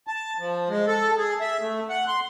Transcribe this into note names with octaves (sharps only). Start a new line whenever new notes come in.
A5
F3
G#3
A4
G#4
E5
A3
F#5
C6